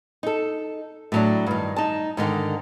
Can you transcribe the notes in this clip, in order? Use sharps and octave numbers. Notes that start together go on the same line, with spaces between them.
D#4 A4
A2 F#3 D4
G2 D#3
D#4 A5
G#2 D3 D#3